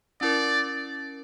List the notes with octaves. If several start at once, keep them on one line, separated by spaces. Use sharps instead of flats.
C#4 E4 A#4 D5